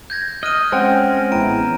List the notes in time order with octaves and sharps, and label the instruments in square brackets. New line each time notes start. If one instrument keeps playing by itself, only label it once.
[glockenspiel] G6 G#6 A#6
[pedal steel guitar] D#5 [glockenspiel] F6 F#6 D#7
[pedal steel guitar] G#3 C4 C#4 [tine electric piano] C5 F#5 G5 [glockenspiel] A#6
[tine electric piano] A1 B3 E4 [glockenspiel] A#5 D7 D#7